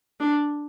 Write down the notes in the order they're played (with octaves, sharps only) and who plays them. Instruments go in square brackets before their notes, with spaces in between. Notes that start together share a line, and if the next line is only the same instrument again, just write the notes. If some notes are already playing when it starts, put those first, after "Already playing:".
[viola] D4